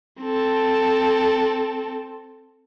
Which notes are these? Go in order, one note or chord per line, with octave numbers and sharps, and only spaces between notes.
C4 A4